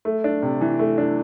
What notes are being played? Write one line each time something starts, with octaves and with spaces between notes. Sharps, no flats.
A3
D4
C3
E3
A3
D4